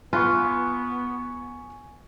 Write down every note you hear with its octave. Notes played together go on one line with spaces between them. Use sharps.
B3 F4 B4 G#5 C#6